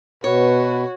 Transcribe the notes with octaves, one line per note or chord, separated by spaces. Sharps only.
B2 F#4 B4 C#5